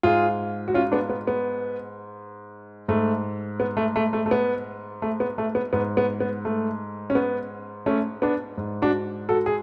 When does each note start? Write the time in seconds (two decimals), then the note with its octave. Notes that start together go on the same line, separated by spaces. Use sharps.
0.03 G#2 F4 G#4
0.68 F#4
0.74 C#4 F4
0.92 B3 D4
1.09 B3
1.27 B3
2.88 G#2 A3
3.60 B3
3.77 A3
3.96 A3
4.13 A3
4.26 A3
4.31 B3
5.02 A3
5.20 B3
5.38 A3
5.55 B3
5.73 G#2 B3
5.97 B3
6.20 B3
6.45 A3
7.10 C#4
7.15 B3
7.86 A3 C#4
8.22 B3 D4
8.57 G#2
8.82 D4 F#4
9.29 F#4 A4
9.46 G#4